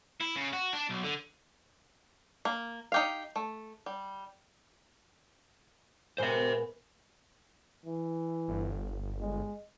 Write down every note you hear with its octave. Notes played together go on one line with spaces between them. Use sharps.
E4
C#3
F#4
D4
B1
D3
A#3
D#4 G4 F5
A3
G3
A#2 G#3 B3 C5 E5
E3
G1
G#3